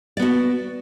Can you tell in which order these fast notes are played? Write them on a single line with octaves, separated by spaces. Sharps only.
D5 B3 F#4